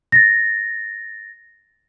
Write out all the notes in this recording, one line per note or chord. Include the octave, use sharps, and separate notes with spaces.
A6 A#6